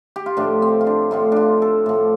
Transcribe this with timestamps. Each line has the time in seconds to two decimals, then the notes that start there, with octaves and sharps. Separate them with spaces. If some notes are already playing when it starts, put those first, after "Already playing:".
0.16 G4
0.26 F4
0.37 A2 F3 D4
0.62 C4
0.81 F4
0.87 D4
1.11 A2 F3 F4
1.32 D4 F4
1.62 A4
1.86 A2 F3